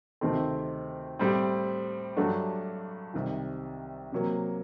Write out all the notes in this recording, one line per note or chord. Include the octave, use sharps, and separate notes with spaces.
D2 C3 D#3 A3 C4
A2 G3 C4
G2 F#3 A3 D4 F#4
C2 C3 D#3
C3 F#3 A#3